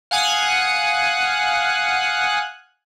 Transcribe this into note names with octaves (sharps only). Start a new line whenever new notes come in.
F5 F#5 G#5 D#6 F#6